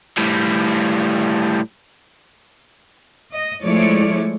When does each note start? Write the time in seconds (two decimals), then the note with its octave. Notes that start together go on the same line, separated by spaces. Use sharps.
0.17 A2 G3
3.31 D#5
3.63 F3 G#3 A3 E4 C#5 D5